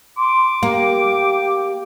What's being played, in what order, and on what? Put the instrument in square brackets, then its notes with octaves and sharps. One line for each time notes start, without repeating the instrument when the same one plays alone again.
[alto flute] C6 [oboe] D6
[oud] A#3 [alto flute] G4